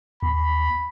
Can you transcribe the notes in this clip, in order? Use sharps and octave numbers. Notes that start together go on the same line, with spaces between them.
D#2 B5